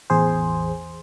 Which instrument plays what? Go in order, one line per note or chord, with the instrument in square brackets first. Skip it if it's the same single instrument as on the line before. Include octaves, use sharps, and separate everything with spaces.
[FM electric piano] A1 E2 G#4 C5